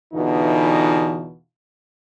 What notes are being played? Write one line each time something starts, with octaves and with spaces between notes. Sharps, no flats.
E2 B2 D3 E3 D#4 F4